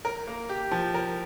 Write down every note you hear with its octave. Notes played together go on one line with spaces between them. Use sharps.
A#4
A#3
G4
F3
A#4